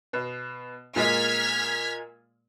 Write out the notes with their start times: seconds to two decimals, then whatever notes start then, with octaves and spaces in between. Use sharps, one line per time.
0.13 B2
0.96 A#2 G#3 A#3 F6 G#6 B6